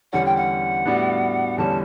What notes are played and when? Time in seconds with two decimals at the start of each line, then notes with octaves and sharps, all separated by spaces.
0.12 E2 D3 G3 C#4 F#5
0.25 G5
0.36 F#5
0.86 A2 G3 B3 D4 F#4
1.58 E2 D3 G3 C#4 A5